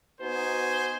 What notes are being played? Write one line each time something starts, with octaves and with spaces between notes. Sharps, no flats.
B3 D#4 F#4 B4 C5 G#5